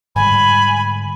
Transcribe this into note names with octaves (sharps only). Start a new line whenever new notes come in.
G#2 D3 G3 G#5 B5